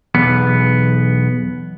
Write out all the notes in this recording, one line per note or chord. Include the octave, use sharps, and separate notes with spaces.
B1 E2 B3